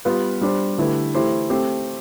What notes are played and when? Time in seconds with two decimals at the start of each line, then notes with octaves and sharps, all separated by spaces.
0.05 G3 B3 F4 B4
0.41 G3 D4 G4 C5
0.78 D3 A3 E4 G4 B4
1.15 E3 A3 E4 G4 C5
1.50 A3 C4 G4 C5